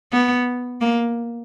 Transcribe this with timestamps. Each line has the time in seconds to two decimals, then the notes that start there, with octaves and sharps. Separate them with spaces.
0.13 B3
0.81 A#3